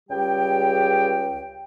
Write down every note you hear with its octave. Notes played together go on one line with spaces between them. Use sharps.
C#2 C#3 G3 G4 G5